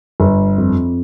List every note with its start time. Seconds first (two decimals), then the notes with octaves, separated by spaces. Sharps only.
0.20 G1
0.58 F2